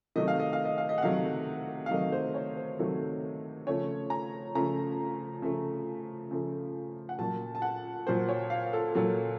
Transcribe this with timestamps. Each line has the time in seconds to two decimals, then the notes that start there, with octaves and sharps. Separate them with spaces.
0.16 C3 D#3 F#3 A3 D#5
0.28 F5
0.40 D#5
0.53 F5
0.65 D#5
0.78 F5
0.89 D#5
0.98 F#5
1.02 C3 D#3 F#3 A3 F5
1.86 F5
1.91 C3 D#3 F#3 A3 D#5
2.12 C5
2.34 C#5
2.57 C5
2.79 C3 D#3 F#3 A3
3.67 C#3 F3 A3 C#5
4.10 A#5
4.55 C#3 F3 A3 A#5
5.42 C#3 F3 A3
6.31 C#3 F3 A3
7.09 F#5
7.18 A#2 F#3 A#3 A5
7.55 A5
7.62 F#5
8.07 A#2 F#3 A#3 C5
8.28 C#5
8.50 F5
8.73 A4
8.94 A#2 F#3 A#3 A4